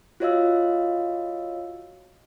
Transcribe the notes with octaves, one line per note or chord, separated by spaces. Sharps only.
F4 F#4 C#5 D#5 F5 E6